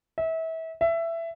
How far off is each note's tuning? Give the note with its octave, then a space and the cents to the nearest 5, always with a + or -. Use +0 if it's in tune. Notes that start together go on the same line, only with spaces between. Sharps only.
E5 -30
E5 +15